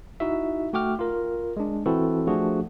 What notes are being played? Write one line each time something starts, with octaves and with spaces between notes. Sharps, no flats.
D#4 E4 F#4 E5
A3 F#4 G5 D6 F6
F4 A#4
G#3 D4
E3 C4 E4 F#4 A4
F3 A3 D4 F#4 G#4